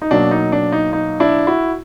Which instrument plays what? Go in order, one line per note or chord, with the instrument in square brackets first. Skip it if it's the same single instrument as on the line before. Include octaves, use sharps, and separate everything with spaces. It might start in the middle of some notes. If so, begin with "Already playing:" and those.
[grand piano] D#4
B2 F#3 A#3 D4
D#4
D4
D#4
D#4
D4 E4
E4 F#4